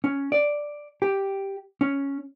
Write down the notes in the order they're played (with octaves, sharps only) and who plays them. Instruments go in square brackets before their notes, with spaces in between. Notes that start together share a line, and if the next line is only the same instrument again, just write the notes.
[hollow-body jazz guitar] C#4
D5
G4
C#4